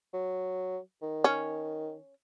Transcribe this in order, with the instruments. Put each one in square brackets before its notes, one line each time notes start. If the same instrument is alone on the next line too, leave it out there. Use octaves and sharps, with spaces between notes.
[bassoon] F#3
D#3
[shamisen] C#4